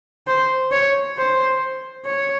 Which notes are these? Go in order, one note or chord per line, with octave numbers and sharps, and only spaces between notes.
C5
C#5
C5
C#5